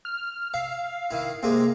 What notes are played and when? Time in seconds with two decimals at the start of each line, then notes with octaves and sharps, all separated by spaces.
0.05 F6
0.54 E5 F5
1.11 D#3 E4
1.43 C3 G#3 A#3